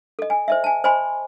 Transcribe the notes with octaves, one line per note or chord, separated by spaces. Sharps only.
A4 D#5
G#5
C5 D#5 E5
G#5 A5
C5 D#5 G#5 B5 C6